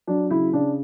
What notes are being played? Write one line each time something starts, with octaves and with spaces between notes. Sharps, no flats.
F#3 D4
C#3 E4
C#3 D4